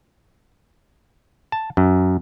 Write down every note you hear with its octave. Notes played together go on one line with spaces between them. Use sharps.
A5
F#2